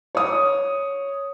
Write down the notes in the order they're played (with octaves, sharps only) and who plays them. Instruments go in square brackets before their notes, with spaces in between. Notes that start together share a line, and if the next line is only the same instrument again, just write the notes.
[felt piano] C#5 D#6